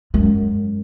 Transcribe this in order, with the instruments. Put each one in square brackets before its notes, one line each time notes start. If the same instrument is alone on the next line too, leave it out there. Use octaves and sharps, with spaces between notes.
[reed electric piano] F#2 [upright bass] G#3